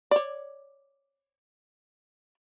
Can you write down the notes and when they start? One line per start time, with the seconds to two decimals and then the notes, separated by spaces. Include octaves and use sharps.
0.11 C#5 D5